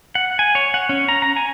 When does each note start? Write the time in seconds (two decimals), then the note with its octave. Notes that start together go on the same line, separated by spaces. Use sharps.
0.15 F#5
0.39 G#5
0.55 C#5
0.74 F#5
0.89 C#4
1.08 A#5
1.22 A#5
1.37 G#5